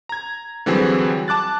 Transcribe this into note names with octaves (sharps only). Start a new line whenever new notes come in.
A#5 G#6
D3 E3 F#3 G3 C4 G#4
A5 D6 F#6 A6